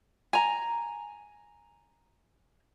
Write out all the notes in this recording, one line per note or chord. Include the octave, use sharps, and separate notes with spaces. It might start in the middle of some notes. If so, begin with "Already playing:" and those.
G#5 A#5